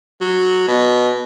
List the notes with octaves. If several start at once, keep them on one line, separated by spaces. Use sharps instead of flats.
F#3
B2